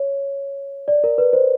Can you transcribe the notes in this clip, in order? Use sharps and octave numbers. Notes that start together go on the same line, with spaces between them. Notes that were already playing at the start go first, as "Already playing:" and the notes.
Already playing: C#5
D5
A#4
B4
C5